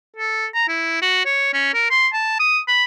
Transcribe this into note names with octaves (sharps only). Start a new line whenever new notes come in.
A4
A#5
E4
F#4
C#5
C#4
A#4
C6
A5
D#6
B5